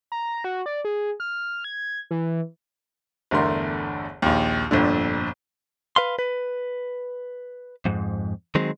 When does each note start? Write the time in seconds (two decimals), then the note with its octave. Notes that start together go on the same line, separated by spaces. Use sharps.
0.12 A#5
0.44 F#4
0.66 D5
0.85 G#4
1.20 F6
1.64 G#6
2.11 E3
3.31 G1 E2 D3 A3 A#4 C6
4.22 A#1 D#2
4.71 G1 F2 A#2 D3
5.96 B4 F5 C6
6.19 B4
7.85 F2 G#2
8.55 D#3 F#3 G#3 C4